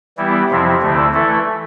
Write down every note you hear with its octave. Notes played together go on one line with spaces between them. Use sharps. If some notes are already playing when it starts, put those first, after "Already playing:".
E3 G3 B3 E4 G4
F2 C3 F3 C4 E4
D2 D3 A3 C4 E4
E3 A3 E4 A4